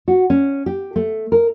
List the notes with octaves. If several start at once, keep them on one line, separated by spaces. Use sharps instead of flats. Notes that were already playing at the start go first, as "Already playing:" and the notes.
F#4
C#4
G4
A3
A#4